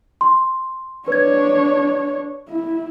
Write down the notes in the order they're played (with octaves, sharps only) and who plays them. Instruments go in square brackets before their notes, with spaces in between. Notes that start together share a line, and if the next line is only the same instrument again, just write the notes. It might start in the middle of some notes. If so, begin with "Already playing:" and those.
[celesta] C6
[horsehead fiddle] D4 C#5 [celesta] B4 G#6
[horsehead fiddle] E4